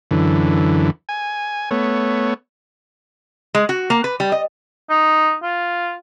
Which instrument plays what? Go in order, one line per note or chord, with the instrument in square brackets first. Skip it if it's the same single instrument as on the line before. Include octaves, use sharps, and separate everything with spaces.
[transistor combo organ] F#2 D3 E3
G#5
A3 B3 C#5
[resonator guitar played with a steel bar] G#3
F#4
A#3
B4
G3
D#5
[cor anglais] D#4
F4